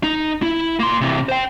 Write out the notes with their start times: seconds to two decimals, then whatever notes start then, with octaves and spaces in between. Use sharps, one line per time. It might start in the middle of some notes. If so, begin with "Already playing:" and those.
0.03 D#4
0.42 E4
0.80 A#3 C6
1.01 C3 E3
1.29 C5 G5